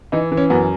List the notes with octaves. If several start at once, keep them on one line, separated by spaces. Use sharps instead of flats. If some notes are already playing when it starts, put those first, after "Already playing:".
E3 D#4
E3
C#4
F#2 B3